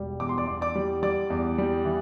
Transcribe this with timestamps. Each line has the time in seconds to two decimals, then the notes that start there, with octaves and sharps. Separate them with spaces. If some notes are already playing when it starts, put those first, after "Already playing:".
Already playing: E1 G3
0.20 E2 D6
0.29 C6
0.38 D5 D6
0.47 E2
0.61 D5 D6
0.76 G3
1.03 G3 D5 D6
1.30 E2
1.58 G3
1.85 E3